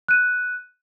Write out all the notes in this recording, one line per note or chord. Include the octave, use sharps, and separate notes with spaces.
F#6 D#7